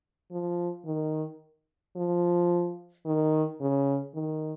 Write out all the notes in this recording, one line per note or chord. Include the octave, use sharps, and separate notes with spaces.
F3
D#3
F3
D#3
C#3
D#3